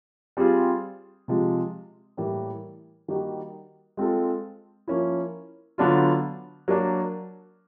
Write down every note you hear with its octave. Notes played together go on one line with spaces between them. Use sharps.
G3 C4 F4 G#4
C3 F3 G#3
A2 E3 G3 A#3
D#3 G3 A#3 D#4 F#4
G#3 C4 F4 A4
F3 A#3 C#4 E4
D3 F#3 B3 D4 F4
F#3 A#3 D4